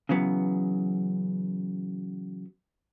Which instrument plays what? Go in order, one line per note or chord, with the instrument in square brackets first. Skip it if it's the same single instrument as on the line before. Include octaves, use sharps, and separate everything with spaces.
[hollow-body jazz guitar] C#3 E3 F#3 B3